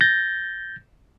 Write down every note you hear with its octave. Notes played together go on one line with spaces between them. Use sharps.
G6 A6 A#6